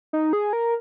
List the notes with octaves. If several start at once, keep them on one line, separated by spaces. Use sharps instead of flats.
D#4
G#4
A#4